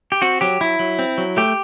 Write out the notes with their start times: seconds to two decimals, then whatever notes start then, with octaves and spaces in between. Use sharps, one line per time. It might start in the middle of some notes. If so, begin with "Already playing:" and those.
0.12 G4
0.22 C4 F#4
0.41 F#3 G4
0.61 F#3 E4
0.79 F#3
0.99 C4
1.18 F#3
1.37 A3 G4